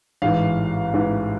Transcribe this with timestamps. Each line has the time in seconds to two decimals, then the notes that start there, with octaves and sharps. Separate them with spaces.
0.22 A1 G#2 E3 F5
0.94 A1 G#2 E3